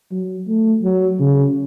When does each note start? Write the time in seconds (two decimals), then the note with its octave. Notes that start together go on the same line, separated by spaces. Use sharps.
0.12 F#3
0.48 A3
0.83 F#3
1.20 C#3